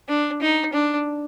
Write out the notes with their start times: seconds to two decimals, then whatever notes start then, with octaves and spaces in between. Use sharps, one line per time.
0.08 D4
0.42 D#4
0.73 D4